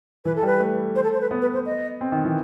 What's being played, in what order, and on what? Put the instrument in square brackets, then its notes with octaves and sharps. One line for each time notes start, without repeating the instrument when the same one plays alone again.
[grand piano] E3 [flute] B4
[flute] A4
[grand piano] G3 [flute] B4
[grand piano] A3
[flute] C5
A4
C5
B4
[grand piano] B3
[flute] B4
C5
D#5
[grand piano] C4
D#3
E3